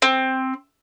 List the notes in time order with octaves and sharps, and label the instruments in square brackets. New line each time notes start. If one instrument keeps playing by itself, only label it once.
[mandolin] C4